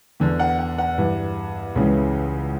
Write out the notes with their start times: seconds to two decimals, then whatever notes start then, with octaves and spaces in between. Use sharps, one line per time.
0.20 E2 D3
0.39 F#5
0.59 F#5
0.78 F#5
0.98 G2 E3
1.75 C#2 C#3 E3